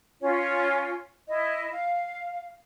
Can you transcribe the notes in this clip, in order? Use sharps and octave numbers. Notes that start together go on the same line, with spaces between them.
C#4 F4 C#5
E4 D#5
F5